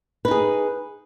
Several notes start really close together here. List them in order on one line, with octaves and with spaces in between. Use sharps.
B4 D#4 G#4